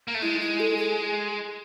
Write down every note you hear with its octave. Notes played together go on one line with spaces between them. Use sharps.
A#3
A3
G#3 E4
E4
A4
G#4